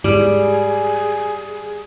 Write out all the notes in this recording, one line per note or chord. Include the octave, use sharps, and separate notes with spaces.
G#2 G3 G#4